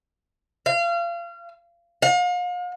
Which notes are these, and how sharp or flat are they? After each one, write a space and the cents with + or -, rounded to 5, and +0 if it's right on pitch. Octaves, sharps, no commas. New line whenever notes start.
F5 -30
F5 +40